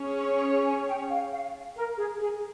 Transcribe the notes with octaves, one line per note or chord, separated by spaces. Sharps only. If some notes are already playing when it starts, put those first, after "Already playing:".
Already playing: C#4 G#4 C#5
G#5
G5
F5
F5
A#4
G#4
G#4